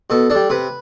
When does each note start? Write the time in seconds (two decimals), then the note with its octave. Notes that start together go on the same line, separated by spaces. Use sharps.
0.10 B2 A4
0.30 D4 A4
0.35 G3
0.50 C3 B4